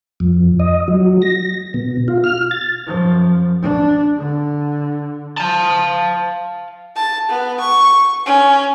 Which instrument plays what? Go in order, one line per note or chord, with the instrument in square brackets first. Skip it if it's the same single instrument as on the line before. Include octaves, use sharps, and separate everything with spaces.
[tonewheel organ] F2
D#5
F#3
A#6
B2
F4
F6
A6
[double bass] F#2 F3
D4
D3
[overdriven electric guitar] F5 A5
[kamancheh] A5
B3
C#6
C#4